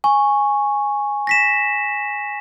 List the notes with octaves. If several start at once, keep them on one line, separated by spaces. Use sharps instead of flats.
G#5 C#6
A#6 B6 E7